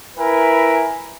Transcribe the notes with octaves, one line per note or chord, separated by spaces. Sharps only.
E4 A#4 B4 G#5